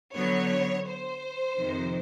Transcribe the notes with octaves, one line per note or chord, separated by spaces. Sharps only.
D3 F#3 B3 C#5
C5
F2 C3 D#3